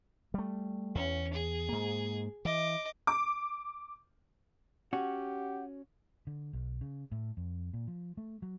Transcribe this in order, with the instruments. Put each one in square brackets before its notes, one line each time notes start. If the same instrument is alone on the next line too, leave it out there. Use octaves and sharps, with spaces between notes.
[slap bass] G3 A3
[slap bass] E2 [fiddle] C#4
[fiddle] G#4
[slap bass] G#2 A#3
[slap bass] E3 [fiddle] D#5 D6
[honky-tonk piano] D6
[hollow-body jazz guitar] C#4 F#4 [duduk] G4 [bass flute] F#5
[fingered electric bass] D3
B1
C#3
A2
F2
A#2
F3
A3
F#3